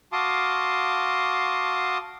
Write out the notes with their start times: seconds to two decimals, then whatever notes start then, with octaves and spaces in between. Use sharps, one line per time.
0.12 F#4 F5 A5 C6 D6 D#6